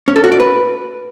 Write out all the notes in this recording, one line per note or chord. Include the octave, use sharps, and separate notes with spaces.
C#4
A4
F#4
D5
B4